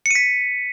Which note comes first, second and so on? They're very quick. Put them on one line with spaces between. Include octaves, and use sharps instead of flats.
C#7 D#7 B6